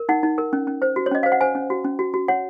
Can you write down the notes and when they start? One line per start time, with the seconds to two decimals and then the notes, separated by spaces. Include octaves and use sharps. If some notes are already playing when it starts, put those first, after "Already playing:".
Already playing: A#4
0.09 D#4 F#5
0.23 D#4
0.38 A#4
0.53 C#4
0.67 C#4
0.82 C5
0.96 F#4
1.06 C#5
1.12 C#4 D#5
1.23 C5 F5
1.32 F#5
1.41 C5 G#5
1.55 C#4
1.70 F#4
1.84 C#4
1.99 F#4
2.14 F#4
2.28 C#5 F#5